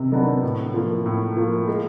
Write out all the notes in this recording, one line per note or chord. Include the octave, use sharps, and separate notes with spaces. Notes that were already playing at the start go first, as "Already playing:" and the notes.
Already playing: C3 D#3
D#3 F#3 B3 D4
A2
F3 A#3
A2
F3 A#3
G#3